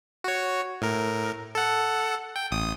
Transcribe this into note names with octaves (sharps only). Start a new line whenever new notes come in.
F#4 C#5
A2 A#4
A4 F#5
G5
A1 D#6